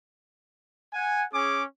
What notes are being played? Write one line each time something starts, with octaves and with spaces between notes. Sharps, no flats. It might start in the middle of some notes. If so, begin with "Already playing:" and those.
F#5 G#5
C#4 G#4 D6